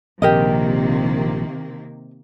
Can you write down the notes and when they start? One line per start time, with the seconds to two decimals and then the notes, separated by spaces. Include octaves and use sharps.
0.22 A#1 C3 D#3 A#3 G4 A#4 D#5